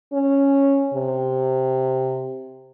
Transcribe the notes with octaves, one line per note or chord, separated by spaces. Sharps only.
C#4
C3